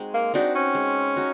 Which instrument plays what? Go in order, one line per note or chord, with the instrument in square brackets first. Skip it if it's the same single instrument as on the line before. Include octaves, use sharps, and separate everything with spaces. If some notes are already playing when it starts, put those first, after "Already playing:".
Already playing: [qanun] G#3 C4 D#4 F#4
[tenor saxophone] A#3
[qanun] C4 D#4 F#4 [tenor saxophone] D4
[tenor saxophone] C#4
[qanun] G#3
D#4 F#4